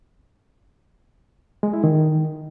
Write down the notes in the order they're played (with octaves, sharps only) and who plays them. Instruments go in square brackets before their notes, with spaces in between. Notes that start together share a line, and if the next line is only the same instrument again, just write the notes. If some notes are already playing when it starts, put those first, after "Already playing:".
[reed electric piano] G#3
E4
D#3